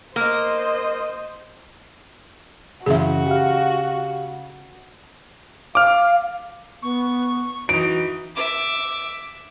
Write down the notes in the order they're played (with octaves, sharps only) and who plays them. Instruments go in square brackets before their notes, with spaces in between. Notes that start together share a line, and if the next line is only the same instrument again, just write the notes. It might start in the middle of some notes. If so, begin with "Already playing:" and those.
[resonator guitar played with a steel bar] A#3 [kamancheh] C5 D#5
[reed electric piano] F#2 E3 [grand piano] C#3 [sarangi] F#4 [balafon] G#4 E5
[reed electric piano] G4 F5
[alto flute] F5 [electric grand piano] D6 F6
[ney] B3 [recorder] C#6
[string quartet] E3 D#4 [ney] F#4 [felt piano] D7
[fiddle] E5 D6